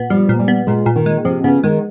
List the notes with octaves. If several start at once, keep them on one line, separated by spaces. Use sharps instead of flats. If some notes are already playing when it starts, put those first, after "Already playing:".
Already playing: A#2 B3
F3 G3
A#2
G3
B3
A#2 G#3
A#2
D#3
G#3
C3 F3
C#3 B3
D#3 G#3